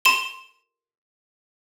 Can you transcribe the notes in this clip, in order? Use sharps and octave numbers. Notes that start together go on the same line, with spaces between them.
C6 E7 G7